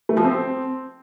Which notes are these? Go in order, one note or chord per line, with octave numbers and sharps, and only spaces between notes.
A3
F3
C4